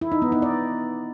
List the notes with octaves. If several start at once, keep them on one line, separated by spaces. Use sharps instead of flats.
E4
D#4
B3
D#4
D5